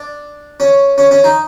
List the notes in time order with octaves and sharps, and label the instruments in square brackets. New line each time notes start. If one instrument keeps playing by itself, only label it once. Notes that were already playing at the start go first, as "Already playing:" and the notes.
Already playing: [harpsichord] D4
C#4
C#4
C#4
D#4